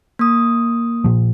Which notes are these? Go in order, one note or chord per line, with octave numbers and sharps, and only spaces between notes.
A#3 D#6
A#2 F3